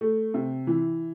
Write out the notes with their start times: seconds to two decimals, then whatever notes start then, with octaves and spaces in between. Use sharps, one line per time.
0.01 A3
0.34 C3
0.67 E3